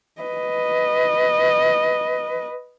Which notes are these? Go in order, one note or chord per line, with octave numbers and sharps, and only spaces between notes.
B4 D#5